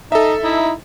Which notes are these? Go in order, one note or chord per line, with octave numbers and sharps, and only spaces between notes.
D#4 A4 E5
D#4 E4